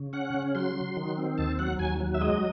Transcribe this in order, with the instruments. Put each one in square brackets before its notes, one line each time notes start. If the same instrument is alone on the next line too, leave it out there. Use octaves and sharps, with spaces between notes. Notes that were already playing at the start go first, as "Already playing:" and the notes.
Already playing: [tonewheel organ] C#3
C#4 F#5
C#3
F#3 C6
F#3
D#3
C4
D#2 A5
F#3 F#5
D#2 G#5
F#3
E5
G#3 D#5